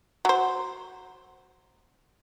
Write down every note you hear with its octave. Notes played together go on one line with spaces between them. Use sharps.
F#3 C5